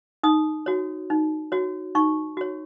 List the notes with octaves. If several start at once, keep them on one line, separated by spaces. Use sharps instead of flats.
D#4 D#6
F#4 C#5
D#4
F#4 C#5
D#4 C#6
F#4 C#5